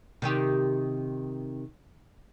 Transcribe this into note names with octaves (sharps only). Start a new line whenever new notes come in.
C3 D#3 G4